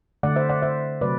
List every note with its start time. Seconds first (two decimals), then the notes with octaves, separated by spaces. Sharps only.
0.23 D3 A3 D5 F#5
0.36 C5 E5
0.49 D5 F#5
0.62 C5 E5
1.01 C3 F#3 A3 B4 D5